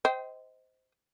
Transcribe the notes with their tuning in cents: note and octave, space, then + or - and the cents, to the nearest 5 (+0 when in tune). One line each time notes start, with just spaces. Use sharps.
C5 -15 D#5 +20 G5 -15